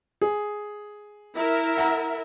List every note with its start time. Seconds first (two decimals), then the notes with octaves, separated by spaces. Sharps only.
0.21 G#4
1.37 E4 A#4 E5
1.77 F#5 A#5